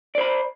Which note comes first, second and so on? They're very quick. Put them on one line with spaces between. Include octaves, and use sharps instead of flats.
D5 C5 B5